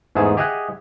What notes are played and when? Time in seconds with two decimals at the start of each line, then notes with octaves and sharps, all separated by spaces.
0.15 E2 G#2 A3 G#4 A5
0.37 G4 G#4 D#5 E5 F#5